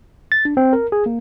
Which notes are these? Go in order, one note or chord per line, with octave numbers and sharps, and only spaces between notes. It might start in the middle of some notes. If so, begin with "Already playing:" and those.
A6
D4
C4
A#4
G#4
A#3